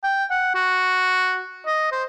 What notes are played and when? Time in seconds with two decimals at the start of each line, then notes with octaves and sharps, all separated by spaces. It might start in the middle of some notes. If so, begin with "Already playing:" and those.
0.04 G5
0.30 F#5
0.55 F#4
1.66 D#5
1.92 C5